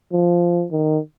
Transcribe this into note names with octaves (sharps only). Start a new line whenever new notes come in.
F3
D#3